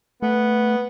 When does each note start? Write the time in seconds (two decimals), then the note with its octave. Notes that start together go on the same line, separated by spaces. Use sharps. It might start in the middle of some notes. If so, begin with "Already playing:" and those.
0.22 A3 B3